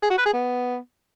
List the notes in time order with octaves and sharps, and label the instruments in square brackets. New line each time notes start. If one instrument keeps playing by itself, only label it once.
[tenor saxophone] G#4
F#4
B4
G#4
B3